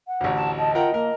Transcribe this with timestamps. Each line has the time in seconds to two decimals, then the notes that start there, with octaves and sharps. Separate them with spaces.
0.07 F#5
0.21 A1 D2
0.36 A5
0.58 D#5 A5
0.75 F4 A#4 F#5 G5
0.94 A#3 A#4